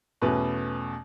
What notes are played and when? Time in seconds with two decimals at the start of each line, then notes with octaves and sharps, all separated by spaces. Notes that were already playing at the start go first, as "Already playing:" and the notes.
0.22 E2 B2 A3 C#4 B4